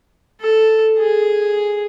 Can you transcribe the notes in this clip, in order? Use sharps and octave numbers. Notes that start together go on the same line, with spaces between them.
A4
G#4